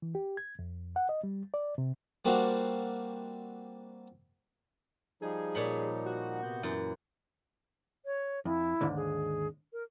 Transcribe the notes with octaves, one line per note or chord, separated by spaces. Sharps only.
E3
G4
G#6
F2
F#5
D#5
G3
D5
C3
G3 A#3 C4 D4 F#4 F5
F3 G3 D#4 G#4
A#2 C#5 B5
F#4
C3 B3 G6
F#2 E3
C#5
F2 E4
D#2 G#2 D3
G#4
A#4